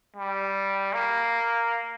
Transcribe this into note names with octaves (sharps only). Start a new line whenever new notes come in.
G3
A#3